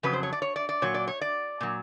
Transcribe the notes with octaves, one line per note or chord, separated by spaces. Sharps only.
F2 C#3 F#3 B4
C5
C#5
D5
C#5
D5
D5
A#2 F#3 C#5
D5
C#5
D5
A#2 F#3